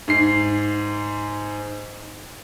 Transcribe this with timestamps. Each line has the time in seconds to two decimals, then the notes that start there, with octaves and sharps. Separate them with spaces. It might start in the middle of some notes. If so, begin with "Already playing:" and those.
0.08 G#2 C7